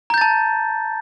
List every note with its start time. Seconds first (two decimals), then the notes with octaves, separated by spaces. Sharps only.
0.10 A#5
0.14 G6
0.18 A6
0.21 A5